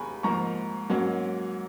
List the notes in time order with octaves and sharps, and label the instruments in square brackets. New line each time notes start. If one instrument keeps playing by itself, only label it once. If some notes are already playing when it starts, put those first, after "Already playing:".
Already playing: [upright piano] D#2 G#3 G#5 A#5 B5 C#6
G#2 F3 A#3 A#5 C#6
G#2 F#3 A#3 C#4